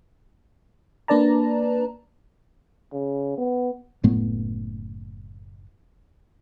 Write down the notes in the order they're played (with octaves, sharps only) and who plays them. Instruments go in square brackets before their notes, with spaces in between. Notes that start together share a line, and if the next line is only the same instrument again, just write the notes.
[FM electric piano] A#3 D4 B4 D5 A5 A#5
[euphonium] C#3
B3
[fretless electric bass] F#1 A2 A3 B3